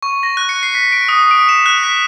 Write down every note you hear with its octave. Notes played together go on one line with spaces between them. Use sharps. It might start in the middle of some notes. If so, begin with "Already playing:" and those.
C#6
A#6
F#6
C#7
C7
B6
D7
D#6
D7
E7
F#6
B6